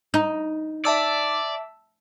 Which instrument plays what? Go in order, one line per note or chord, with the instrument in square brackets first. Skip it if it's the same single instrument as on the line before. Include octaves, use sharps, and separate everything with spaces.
[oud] D#4
[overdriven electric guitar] D5 [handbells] E5 A5 E6